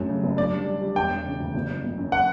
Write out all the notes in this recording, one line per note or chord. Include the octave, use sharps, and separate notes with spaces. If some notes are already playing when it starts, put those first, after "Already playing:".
Already playing: F#2 F#3 A3
C#3
F#1
D4 D5
G3
G3
G3
E1 G5
E1
C#3
D2
F#1
F#1
F#1
F#2
F#5